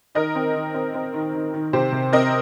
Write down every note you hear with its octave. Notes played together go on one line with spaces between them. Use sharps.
D#3 A#4 D#5
C4
D#3
C4
C4
D#3
D#3
D#3
C3 G4 C5
C3
C4 A#4 D#5